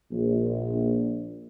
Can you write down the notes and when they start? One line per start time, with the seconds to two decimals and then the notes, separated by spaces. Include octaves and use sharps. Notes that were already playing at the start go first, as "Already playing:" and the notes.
0.12 A#1